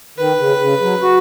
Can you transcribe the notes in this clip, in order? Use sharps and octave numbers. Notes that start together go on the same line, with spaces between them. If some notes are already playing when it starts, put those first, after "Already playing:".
D#3 B4
C#3
C#3
F#3
F#4